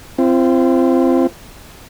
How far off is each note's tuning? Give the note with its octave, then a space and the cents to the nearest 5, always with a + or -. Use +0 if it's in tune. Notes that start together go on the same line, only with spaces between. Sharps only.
C4 +0 F4 -40